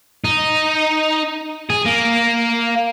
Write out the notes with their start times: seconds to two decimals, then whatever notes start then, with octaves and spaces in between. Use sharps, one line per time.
0.24 D#4
1.70 G#4
1.86 A#3